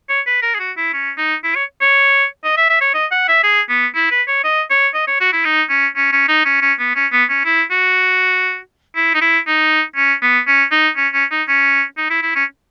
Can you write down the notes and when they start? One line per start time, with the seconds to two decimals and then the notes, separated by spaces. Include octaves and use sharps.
0.09 C#5
0.27 B4
0.42 A#4
0.55 G#4
0.60 F#4
0.77 E4
0.93 C#4
1.18 D#4
1.44 E4
1.55 C#5
1.81 C#5
2.44 D#5
2.57 E5
2.69 E5
2.81 C#5
2.94 D#5
3.11 F#5
3.28 E5
3.44 G#4
3.69 B3
3.95 E4
4.11 B4
4.28 C#5
4.44 D#5
4.70 C#5
4.94 D#5
5.07 C#5
5.20 F#4
5.33 E4
5.45 D#4
5.70 C#4
5.96 C#4
6.12 C#4
6.29 D#4
6.45 C#4
6.61 C#4
6.79 B3
6.95 C#4
7.12 B3
7.29 C#4
7.45 E4
7.71 F#4
8.96 E4
9.14 D#4
9.21 E4
9.47 D#4
9.96 C#4
10.22 B3
10.47 C#4
10.71 D#4
10.97 C#4
11.13 C#4
11.31 D#4
11.48 C#4
11.97 D#4
12.10 E4
12.23 E4
12.35 C#4